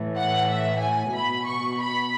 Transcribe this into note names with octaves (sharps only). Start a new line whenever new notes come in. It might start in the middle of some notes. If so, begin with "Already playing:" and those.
Already playing: A2 E3
F#5
E5
G#5
B2 B5
C#6
B5